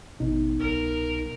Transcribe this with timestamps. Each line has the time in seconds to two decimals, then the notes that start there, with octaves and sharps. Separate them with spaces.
0.20 A1 B2 D#4
0.59 C2 A#4